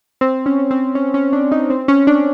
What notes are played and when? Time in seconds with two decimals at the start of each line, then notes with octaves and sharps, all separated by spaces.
0.21 C4
0.46 C#4
0.71 C4
0.95 C#4
1.14 C#4
1.33 D4
1.52 D#4
1.70 C4
1.88 C#4
2.07 D4